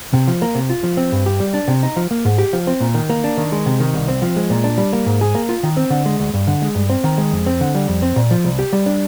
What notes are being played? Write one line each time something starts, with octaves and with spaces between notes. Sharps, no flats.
C3
F3
A#3
C3
F4
F3
C4
G2
G4
G3
D4
C3
D#4
F3
A#3
G#2
G4
F3
C4
A#2
D#3
A#3
D4
D#3
G#3
C3
D#3
C2
C4
F3
G#3
A#2
D4
G3
A#3
G#2
G#4
A#3
F4
D#3
C4
D3
G#3
D2
G2
D3
G#3
G2
C4
D#3
G#3
F2
C4
D3
G3
F2
C4
A#2
F3
C2
G4
G3
D4